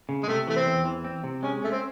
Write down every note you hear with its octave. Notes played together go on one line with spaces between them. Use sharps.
C#3
G#3
C3 A3
E3 A3
C4
E2
E3
C4
C3
G#3 C#4
A3 C#4
C4